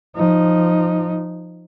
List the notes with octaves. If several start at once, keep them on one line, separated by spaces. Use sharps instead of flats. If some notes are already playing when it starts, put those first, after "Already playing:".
F3 D#4